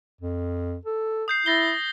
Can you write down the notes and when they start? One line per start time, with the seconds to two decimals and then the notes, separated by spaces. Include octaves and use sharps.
0.21 F2
0.85 A4
1.28 D#6 G6 C7
1.46 E4 A6 A#6 G7